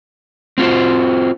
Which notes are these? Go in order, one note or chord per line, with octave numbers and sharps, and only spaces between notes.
C4 F4 F#4 C5